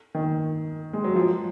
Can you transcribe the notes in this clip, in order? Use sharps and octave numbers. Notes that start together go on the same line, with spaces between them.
D#3
G#3
F#3
F3